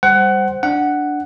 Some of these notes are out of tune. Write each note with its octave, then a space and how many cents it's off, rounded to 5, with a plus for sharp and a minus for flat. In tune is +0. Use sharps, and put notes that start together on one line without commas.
G3 +20 C5 +0 F#5 +20
D4 +0 F#5 +5